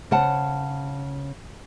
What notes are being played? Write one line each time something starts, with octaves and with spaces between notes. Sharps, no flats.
C#3 C5 F#5 A5